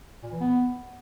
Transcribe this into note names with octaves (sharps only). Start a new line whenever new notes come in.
A#2
E3
B3